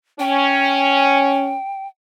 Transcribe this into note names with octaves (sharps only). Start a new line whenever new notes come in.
C#4 G5